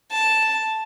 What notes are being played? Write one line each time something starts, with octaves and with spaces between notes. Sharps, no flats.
A5